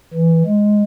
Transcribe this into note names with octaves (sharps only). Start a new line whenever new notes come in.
E3
G#3